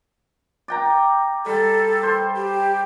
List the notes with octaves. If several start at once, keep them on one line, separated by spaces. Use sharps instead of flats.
D5 G5 A#5
G3 A4
C5
G4